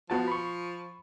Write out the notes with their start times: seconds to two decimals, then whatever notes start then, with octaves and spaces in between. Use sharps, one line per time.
0.10 F3 B3 F#4 A5
0.28 B5 C#6